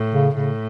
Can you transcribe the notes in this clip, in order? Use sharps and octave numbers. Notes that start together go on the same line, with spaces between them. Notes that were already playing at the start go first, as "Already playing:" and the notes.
Already playing: A2
C#3
A2 C#3